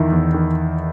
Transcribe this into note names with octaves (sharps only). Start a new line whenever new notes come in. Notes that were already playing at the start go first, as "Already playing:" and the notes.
Already playing: E2 D#3 E4
E2
D#3